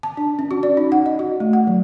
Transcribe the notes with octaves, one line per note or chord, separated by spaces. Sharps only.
A5
D4
C#4
F#4
D5
D#4
F#5
D#5
F#4
A3
F#5
F#3